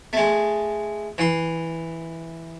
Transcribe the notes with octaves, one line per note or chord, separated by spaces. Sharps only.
G#3 A3
E3 C6